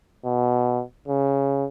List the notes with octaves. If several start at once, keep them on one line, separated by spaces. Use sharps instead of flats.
B2
C#3